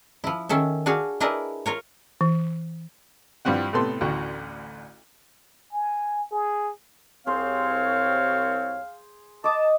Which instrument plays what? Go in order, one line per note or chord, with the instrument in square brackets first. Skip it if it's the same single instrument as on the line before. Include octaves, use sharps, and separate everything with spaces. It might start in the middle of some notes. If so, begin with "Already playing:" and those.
[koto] F3 E4
D#3 C#4 A4 E5
D4 F#4 G#4 F5
D4 E4 G#4 A#4 B4 D#5
F4 A#4 C#5
[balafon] E3
[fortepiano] G2 F3 G3 C4 F#5
A2 C3 B3 G4 A4 C6
A1 D2 F#4 G5
[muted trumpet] G#5
G#4
[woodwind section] C2 C4 C#5 [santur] G#4 C5 C6 [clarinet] F5
[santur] D#5 D6 D#6 [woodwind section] A5